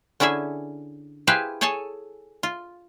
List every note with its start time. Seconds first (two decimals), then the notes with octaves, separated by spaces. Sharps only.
0.20 D3 C#4 E4 G#4 E5
1.27 E4 G4 G#4 B4 C5 F5
1.61 G#4 A4 C#5 G#5 A5
2.43 F4